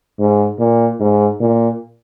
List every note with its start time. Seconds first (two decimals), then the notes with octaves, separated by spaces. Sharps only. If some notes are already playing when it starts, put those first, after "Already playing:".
0.19 G#2
0.59 A#2
1.00 G#2
1.40 A#2